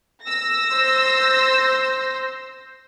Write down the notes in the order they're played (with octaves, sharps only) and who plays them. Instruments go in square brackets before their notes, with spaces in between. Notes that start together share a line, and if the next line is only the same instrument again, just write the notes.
[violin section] E6 A#6
[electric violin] C5